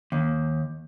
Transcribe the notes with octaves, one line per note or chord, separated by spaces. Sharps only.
D#2